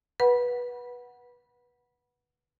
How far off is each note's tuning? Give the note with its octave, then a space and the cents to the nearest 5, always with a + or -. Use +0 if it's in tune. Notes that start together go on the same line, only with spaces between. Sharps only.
B4 -15 F#5 +0 B5 -25